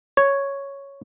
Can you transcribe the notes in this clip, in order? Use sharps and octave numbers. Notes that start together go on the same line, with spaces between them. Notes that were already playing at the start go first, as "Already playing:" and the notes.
C#5